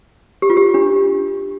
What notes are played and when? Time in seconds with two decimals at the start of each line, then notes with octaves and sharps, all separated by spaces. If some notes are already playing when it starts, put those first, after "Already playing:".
0.42 G4
0.50 F4
0.57 G4
0.74 D4